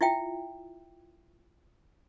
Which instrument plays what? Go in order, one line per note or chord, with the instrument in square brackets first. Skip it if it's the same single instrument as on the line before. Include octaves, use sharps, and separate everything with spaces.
[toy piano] E4 F4 E5 G5